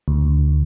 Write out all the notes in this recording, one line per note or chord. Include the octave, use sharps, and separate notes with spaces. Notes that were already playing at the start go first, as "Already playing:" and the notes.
D2